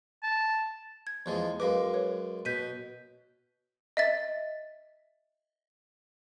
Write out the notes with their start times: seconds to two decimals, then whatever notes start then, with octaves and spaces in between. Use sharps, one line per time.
0.23 A5
1.07 G#6
1.26 E2 F3 G#3
1.60 F#2 G#3 B4 D#5 F5 D6
1.94 B4 C#5
2.45 B2 G6 B6 D#7
3.97 D#5 E5 A6